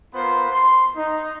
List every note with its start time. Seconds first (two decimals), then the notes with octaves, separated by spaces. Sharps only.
0.14 B3 F4 A#4 C5 B5
0.51 C6
0.97 D#4